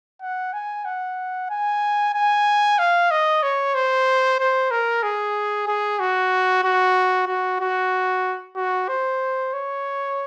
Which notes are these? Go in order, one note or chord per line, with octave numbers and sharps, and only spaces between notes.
F#5
G#5
F#5
G#5
G#5
F5
D#5
C#5
C5
C5
A#4
G#4
G#4
F#4
F#4
F#4
F#4
F#4
C5
C#5